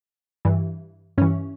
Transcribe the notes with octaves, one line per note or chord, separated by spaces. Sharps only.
G2 E3
G2 E3 C#4